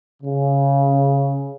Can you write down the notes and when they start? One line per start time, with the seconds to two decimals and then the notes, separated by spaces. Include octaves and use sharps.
0.23 C#3